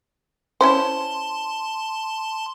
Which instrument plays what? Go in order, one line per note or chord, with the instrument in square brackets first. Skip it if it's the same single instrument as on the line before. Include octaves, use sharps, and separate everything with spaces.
[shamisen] C#4 E4 C5 [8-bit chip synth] A5 C6